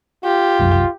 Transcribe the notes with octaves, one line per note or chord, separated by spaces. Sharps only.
F4 G4
F1 C2 F#2